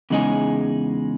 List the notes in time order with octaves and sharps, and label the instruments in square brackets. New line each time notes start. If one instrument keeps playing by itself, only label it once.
[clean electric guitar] E2 C#3 G#3 D#4 G#4